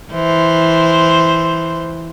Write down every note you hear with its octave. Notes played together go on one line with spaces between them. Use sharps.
E3 C5